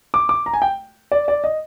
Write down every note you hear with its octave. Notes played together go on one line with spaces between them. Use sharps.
D6
D6
A#5
G#5
G5
D5
D5
D#5